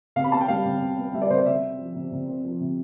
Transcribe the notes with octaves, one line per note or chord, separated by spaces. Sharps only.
C3 F5
B5
B3 A5
G5
G3 F5
C3
C3
B3
G3 E5
D5
C3 C5
D5
C3 E5
C4
F3
C3
C3
C4
F3
C3